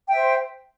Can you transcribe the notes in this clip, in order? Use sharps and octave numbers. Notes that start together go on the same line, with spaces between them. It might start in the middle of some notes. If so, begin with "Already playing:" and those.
C5 E5 G5